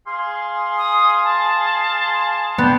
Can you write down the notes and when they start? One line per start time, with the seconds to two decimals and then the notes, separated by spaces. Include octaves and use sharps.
0.06 G#4 F5 C6
0.78 D#6
1.24 A5
2.58 B3 D5 G5